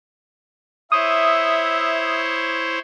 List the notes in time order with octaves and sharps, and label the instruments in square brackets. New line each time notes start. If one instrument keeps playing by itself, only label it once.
[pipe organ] E4 C5 C#5 [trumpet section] E5 [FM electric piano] D#6